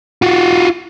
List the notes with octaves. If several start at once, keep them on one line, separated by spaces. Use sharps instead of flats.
F4 F#4